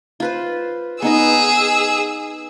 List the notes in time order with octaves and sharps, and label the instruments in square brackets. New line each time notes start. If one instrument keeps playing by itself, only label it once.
[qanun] F4 B4 C5
[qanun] B3 D#4 D#5 [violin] G#4 E6